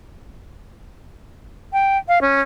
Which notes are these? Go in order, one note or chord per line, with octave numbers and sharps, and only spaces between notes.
G5
F5
C#4